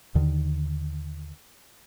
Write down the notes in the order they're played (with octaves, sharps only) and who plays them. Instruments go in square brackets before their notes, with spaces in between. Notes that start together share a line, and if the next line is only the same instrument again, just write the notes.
[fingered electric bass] D#2 D3 D#3